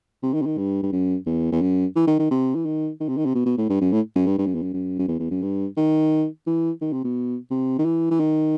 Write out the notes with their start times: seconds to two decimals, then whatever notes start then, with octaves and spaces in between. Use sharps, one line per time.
0.23 C3
0.33 D#3
0.42 C3
0.46 D#3
0.57 G2
0.83 G2
0.92 F#2
1.26 E2
1.52 E2
1.61 F#2
1.95 E3
2.07 D#3
2.19 D#3
2.31 C3
2.55 E3
2.65 D#3
3.00 D#3
3.08 C3
3.17 D#3
3.26 C3
3.34 B2
3.46 B2
3.58 A2
3.69 G2
3.81 F#2
3.92 A2
4.15 F#2
4.27 G2
4.38 G2
4.46 F#2
4.55 E2
4.62 F#2
4.73 F#2
4.99 F#2
5.08 E2
5.19 E2
5.31 F#2
5.42 G2
5.77 D#3
6.47 E3
6.81 D#3
6.93 C3
7.04 B2
7.50 C3
7.79 D#3
7.85 E3
8.11 E3
8.20 D#3